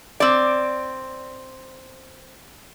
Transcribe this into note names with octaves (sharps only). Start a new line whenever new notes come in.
C4 D5